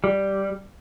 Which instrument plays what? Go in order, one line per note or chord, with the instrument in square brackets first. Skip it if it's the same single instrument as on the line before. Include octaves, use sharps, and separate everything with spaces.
[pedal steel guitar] G3